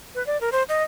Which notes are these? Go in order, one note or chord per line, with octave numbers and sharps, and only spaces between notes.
B4
D5
A#4
C5
D#5